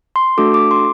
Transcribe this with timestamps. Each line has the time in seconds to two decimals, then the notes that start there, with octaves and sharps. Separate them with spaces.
0.16 C6
0.38 A3 D4 F#4 A4 D6
0.54 D6
0.71 C6